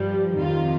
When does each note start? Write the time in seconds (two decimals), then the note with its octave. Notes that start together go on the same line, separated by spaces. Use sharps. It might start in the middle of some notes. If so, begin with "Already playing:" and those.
Already playing: G2 F3 G3
0.39 F2 C3 D#3 F4